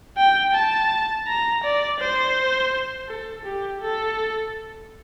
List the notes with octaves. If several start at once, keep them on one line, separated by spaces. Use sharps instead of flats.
G5
A5
A#5
D5
C5
A4
G4
A4